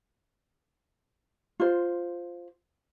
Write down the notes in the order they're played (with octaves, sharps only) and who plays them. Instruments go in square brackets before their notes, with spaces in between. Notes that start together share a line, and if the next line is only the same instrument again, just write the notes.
[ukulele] F4 C5